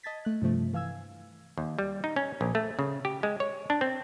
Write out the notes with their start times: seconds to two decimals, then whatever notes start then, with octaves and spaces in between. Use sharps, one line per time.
0.03 D#5 A5 G#6 A6 B6
0.25 A3 F#6
0.42 G2 C3 F3 A3
0.74 E3 F5 G#5 E6 G#6
1.58 D#2
1.79 G3
2.04 D#4
2.16 C#4
2.41 A#1
2.55 A3
2.79 C#3
3.05 G4
3.23 G#3
3.40 C#5
3.70 D4
3.81 C4